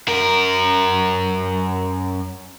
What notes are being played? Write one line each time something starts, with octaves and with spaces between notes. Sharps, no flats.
F#2 A#4